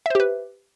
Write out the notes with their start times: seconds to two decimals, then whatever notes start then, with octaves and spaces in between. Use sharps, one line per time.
0.06 E5
0.10 C5
0.15 G4
0.20 B4